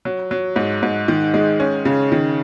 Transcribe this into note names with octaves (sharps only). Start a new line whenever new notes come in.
F#3
F#3
G#2
G#2
D#3
G#3
C#4
C#3
D#3